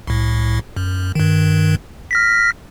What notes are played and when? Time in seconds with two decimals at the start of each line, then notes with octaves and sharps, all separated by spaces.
0.07 C2 A2
0.76 F#2
1.15 G2 D#3
2.11 F6 A#6 B6